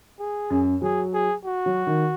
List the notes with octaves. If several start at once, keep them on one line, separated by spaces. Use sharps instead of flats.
G#4
F#2
F#3 G#4
G#4
F#4
F#3
D#3